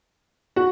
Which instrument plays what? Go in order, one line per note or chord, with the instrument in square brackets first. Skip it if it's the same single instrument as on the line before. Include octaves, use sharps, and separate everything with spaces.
[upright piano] F#4